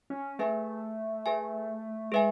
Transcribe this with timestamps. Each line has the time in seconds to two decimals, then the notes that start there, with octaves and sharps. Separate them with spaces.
0.10 C#4
0.39 A3 G#4 B4 E5 G#5
1.26 G#4 B4 E5 G#5
2.12 G#3 G#4 B4 E5 G#5